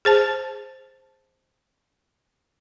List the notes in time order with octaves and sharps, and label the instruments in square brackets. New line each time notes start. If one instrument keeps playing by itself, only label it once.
[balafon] G#4 C5 A5